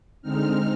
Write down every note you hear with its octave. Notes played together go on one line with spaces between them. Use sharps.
D3 G#3 C4 D#4 F6